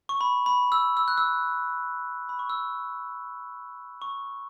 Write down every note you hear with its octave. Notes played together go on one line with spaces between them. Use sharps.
C#6
B5
B5
E6
E6
F#6
E6
B5
C#6
E6
C#6